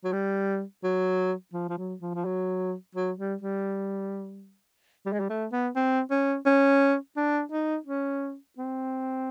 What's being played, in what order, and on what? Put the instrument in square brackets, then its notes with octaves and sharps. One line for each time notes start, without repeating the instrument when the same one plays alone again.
[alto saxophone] F#3
G3
F#3
F3
F3
F#3
F3
F3
F#3
F#3
G3
G3
G3
G#3
G3
A3
B3
C4
C#4
C#4
D4
D#4
C#4
C4